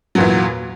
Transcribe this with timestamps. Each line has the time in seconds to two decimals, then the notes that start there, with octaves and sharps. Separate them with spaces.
0.15 F#3
0.18 A#2
0.20 E2